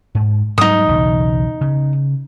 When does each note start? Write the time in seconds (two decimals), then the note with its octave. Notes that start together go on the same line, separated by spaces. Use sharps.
0.15 G#2
0.58 G#2 F#3 G3 D#4 D#6
0.88 B1 E2 C#3
1.61 C#3